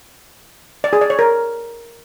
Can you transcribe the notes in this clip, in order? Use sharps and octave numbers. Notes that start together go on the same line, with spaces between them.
D5
G#4
D5
C#5
A#4